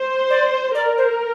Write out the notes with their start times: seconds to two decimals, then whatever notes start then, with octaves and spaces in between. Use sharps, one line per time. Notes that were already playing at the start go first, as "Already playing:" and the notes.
Already playing: C5
0.30 D5
0.75 A#4 D5
0.98 C5